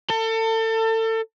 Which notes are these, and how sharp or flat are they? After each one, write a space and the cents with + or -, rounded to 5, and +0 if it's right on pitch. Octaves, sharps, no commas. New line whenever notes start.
A4 +30